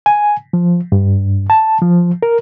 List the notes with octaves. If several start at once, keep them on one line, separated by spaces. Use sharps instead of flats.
G#5
F3
G2
A5
F3
A#4